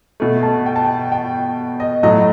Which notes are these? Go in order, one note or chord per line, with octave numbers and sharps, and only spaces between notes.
B2 A3
A5
G5
A5
G5
G5
D#5
A2 F#3 A3 D#5